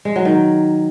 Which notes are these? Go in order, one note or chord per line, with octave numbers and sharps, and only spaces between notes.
G#3
F#3
D#3